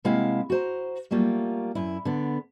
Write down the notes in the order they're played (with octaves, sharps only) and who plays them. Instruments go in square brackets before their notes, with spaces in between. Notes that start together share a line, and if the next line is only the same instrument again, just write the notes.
[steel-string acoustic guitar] C3 G#3 A#3 E4 F5 F#5
F#4 C5 A#5
F#3 G3 A3 A#3 F4
F#2 E4
D3 B3